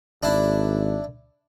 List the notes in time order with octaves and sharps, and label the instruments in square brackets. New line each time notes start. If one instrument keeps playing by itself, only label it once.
[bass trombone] G#1 [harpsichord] D4 E4